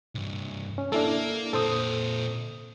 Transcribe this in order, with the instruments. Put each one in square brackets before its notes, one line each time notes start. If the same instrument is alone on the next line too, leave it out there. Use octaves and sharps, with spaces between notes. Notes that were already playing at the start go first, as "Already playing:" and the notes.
[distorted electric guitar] C2 G2
[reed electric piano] C#4
[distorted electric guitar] A#3 [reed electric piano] D4 E4 A4
[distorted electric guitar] A#2 C4 [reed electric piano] A4 C5 D#6